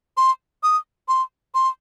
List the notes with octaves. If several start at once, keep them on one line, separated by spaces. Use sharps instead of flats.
C6
D#6
C6
C6